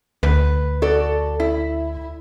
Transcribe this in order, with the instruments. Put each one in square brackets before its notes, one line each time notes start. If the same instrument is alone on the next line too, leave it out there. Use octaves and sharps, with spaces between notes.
[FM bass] D2 [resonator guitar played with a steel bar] B4
[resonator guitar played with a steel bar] F#4 A4 D5
E4